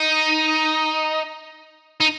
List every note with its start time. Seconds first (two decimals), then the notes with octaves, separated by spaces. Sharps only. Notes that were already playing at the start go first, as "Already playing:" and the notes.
Already playing: D#4
2.00 D#4